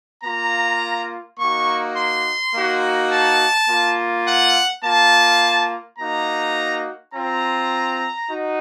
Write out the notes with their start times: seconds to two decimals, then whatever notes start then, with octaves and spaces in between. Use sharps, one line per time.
0.24 A#3 F4 A#5
1.39 A#3 D#4 F#4 C#6
1.97 C6
2.54 A#3 D#4 F#4
3.12 A5
3.70 A#3 F4
4.27 F#5
4.84 A#3 F4 A5
5.99 A#3 D#4 F#4 A#5
7.14 C4 F4 A#5
8.30 D#4 F#4